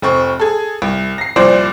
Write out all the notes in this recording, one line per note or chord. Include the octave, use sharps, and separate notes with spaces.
F1 C4 C#6
G#4 A4
C2
A#6 C7
C2 A#2 F3 C5 D5